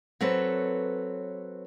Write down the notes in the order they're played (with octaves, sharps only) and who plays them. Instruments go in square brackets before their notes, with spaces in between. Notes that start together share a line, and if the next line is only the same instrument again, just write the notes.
[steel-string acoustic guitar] F#3 C4 A4 B4 C#5